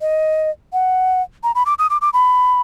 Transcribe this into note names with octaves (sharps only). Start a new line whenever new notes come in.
D#5
F#5
A#5
B5
D6
D#6
D6
D6
B5